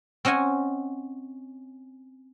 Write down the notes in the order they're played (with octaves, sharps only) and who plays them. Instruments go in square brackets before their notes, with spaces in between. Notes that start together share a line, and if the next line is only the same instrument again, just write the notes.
[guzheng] C4 C#4 D#5 F#5 G#5